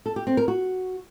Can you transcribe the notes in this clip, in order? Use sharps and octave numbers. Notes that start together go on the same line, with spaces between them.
A4
G4
C4
A#4
F#4